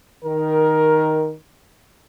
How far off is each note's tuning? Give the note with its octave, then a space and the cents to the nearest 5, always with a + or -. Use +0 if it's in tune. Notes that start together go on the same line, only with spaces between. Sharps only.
D#3 +0 A#4 +15